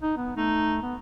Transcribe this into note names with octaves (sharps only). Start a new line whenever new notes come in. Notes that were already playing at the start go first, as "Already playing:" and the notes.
D#4
B3
A3 D#4
B3